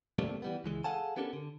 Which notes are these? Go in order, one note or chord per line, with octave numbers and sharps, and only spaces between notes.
C3 G3 A3 A#3 C4 D4
E3 G3 B3
C#2 E3 G#3
G#4 A4 F5 F#5 G#5 A5
B3 C#4 D4 G4 A4 A#4
D3